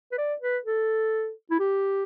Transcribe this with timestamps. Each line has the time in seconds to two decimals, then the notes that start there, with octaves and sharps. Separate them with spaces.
0.12 B4
0.18 D5
0.41 B4
0.65 A4
1.51 E4
1.59 G4